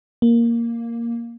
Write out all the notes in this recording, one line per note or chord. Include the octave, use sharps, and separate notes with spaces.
A#3